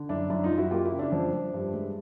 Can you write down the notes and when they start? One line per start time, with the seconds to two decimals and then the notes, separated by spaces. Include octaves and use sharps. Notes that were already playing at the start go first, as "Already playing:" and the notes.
Already playing: D3
0.09 F#2 D4 E4
0.30 F#2 D4 E4
0.44 D#4 F4
0.50 F#2
0.58 E4 F#4
0.71 A#3 F4 G4
0.85 E4 F#4
0.92 C#3
0.99 D4 E4
1.12 F2
1.33 F2
1.54 G2
1.74 G#3